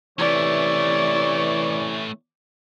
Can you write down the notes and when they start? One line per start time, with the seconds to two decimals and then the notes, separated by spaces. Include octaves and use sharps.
0.19 C3 E3 A3 C#4 C#5 D5